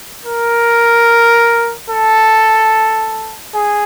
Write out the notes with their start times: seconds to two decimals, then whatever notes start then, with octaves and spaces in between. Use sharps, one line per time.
0.26 A#4
1.90 A4
3.55 G#4